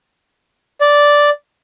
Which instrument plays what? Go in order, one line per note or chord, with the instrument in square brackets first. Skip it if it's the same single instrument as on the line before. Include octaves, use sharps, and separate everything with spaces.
[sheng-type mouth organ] D5